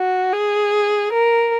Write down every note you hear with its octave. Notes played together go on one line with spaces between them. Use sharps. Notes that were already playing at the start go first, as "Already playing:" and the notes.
Already playing: F#4
G#4
A#4